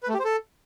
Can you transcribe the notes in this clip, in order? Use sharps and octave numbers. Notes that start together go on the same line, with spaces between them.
B4
A3
G4
C5
A4